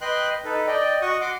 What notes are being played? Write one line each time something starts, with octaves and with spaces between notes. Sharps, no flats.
B4 D#5 G5 C6 F#6
D#4 A4 B4
D5 D#5 G5
F#4 D#5 F#5 C#6 D#6
F#5 C6 D6